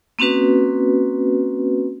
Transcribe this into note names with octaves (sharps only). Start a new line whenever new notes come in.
A#3 C4 C#4 F#4 B4